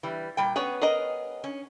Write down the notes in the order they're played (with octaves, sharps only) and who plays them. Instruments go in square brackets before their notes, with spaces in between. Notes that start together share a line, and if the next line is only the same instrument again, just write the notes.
[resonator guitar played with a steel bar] E3 G3
A#2 G3 G5
[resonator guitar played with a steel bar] B3 C#4 [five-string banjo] G#4 C#5
[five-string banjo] G#4 A#4 D#5
[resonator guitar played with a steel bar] C#4